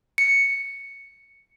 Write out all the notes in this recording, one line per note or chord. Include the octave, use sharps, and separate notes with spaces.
C#7